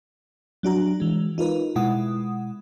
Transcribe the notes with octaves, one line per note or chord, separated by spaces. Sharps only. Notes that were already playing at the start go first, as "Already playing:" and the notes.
F#3 D4 F#4 A#5
E3 G#3
D#4 F4 A#4 B4
B2 G#3 E4 F#5 D#6